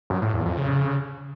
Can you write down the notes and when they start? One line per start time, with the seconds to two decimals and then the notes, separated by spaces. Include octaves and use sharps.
0.10 F#2
0.22 A2
0.34 E2
0.45 F2
0.57 C#3